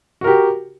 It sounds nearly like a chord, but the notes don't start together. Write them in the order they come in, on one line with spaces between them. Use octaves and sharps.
F#4 A#4 G4